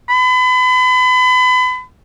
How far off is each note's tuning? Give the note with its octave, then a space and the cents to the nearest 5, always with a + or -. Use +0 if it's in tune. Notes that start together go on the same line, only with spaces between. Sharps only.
B5 +35